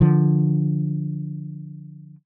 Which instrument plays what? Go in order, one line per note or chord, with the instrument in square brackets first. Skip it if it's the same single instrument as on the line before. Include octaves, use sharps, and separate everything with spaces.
[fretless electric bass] D3 F3